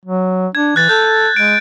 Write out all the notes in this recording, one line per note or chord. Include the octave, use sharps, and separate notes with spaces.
F#3
D4 G#6
E3 F#6 A6
A4 G6
G#3 D7